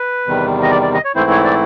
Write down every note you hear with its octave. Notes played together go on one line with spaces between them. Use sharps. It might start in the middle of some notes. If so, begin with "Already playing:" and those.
Already playing: B4
E2 C3 D#3 G3
D#5
D5
D5
D#5
C#5
G#2 E3 A3 C4 E4 C5
C#5
D5